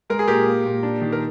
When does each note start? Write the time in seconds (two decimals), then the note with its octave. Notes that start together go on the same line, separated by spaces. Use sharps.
0.10 G#3 A#4
0.19 G#4
0.27 A#2 G4 A#4
0.47 A#3
0.65 A#2
0.83 D4
1.02 D#3
1.12 A#4